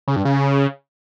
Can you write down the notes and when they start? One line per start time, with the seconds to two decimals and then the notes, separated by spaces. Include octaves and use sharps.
0.08 C#3
0.16 G2
0.25 C#3